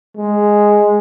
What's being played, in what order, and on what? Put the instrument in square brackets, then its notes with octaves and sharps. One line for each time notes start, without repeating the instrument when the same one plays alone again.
[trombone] G#3